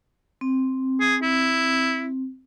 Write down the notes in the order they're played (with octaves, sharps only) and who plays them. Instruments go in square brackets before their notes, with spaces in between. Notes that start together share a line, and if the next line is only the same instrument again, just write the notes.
[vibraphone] C4
[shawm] G#4
E4